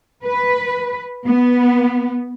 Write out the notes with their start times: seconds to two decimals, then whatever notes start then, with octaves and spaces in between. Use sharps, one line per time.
0.25 B4
1.26 B3